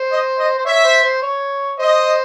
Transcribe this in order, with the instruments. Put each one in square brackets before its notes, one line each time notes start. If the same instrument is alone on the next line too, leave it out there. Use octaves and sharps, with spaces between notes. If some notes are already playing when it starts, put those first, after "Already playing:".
Already playing: [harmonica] C5
[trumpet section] D#5
D#5
[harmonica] C5
[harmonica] C#5 [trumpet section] E5
[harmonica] C5
C5
C#5
[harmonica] C5 [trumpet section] D#5